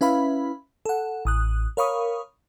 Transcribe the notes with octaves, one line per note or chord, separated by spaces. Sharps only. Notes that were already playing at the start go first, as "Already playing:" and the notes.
C#4 E4 B4 E5 F5 B5
A4 F#5
A1 D#6 F#6
A#4 C#5 F5 B5 C#6 D#6